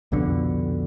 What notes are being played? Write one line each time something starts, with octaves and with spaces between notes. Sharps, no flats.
C2 F2 B2 D3